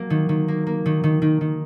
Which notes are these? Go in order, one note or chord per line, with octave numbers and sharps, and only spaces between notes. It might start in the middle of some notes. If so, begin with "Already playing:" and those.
Already playing: F#3 A#3
D#3
D#3
A#3
A#3
D#3
D#3
D#3
D#3